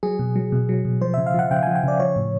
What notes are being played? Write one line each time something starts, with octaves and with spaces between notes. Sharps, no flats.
F#3 G#4
B2
F#3
B2
F#3
B2
F3 C5
C#3 E5
F5
F3 F#5
C#3 G5
F3 G#5
G5
C#3 D5
F3 C#5
A2